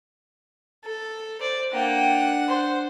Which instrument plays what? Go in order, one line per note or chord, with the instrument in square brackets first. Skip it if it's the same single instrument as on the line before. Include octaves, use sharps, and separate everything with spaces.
[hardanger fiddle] A4
[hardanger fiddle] C5 [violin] D5
[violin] A#3 G5 [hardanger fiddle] D4 F#5
[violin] C5